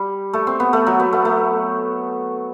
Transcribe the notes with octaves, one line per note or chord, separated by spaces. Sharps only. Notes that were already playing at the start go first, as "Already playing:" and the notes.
Already playing: G3
A3
C4
B3
A3
F#3
B3
A3
A3